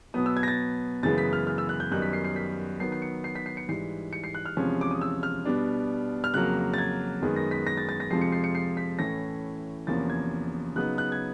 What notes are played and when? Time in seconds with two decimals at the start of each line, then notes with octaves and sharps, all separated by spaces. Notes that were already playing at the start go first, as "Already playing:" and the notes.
0.14 B2 F#3 B3 D#6
0.26 E6
0.37 G#6
0.43 A#6
0.48 A6
1.03 F#2 C#3 E3 G#3 B3 A6
1.18 B6
1.33 F6
1.47 F6
1.58 E6
1.69 F#6
1.80 G6
1.91 F#2 D#3 G3 B3 D#4 F#6
2.02 B6
2.13 C7
2.24 C7
2.36 B6
2.80 D#3 F#3 B3 C7
2.92 C7
3.02 C#7
3.24 C7
3.35 B6
3.46 C7
3.57 C#7
3.68 G#2 E3 G3 C7
4.13 C#7
4.24 C7
4.35 F#6
4.46 F6
4.57 E2 C3 F3 G#3 C#4
4.81 D6
4.91 D#6
5.01 E6
5.23 F6
5.45 B2 G3 B3 D4
6.24 F6
6.34 F2 C#3 F#3 A#3 F#6
6.74 A6
6.78 G#6
7.22 F#2 D#3 G#3 B3
7.36 A#6
7.51 B6
7.67 A#6
7.78 A6
7.89 A6
8.00 A#6
8.10 F2 C3 F3 G#3 C7
8.21 C#7
8.32 C7
8.44 C#7
8.55 C7
8.77 B6
8.99 A2 E3 A3 C#4 A#6
9.87 E2 C3 F3 A#3 C#4 A6
10.10 G#6
10.76 C#3 F#3 B3 D#4 F#6
10.98 F#6
11.12 G#6